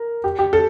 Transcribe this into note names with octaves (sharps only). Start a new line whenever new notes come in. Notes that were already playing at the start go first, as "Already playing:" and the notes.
Already playing: A#4
G4
G4
A4